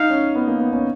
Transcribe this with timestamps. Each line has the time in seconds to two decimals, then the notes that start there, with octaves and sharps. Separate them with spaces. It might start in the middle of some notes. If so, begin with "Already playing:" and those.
Already playing: D#4 F5
0.10 C#4
0.35 B3
0.47 A#3
0.60 B3
0.73 C#4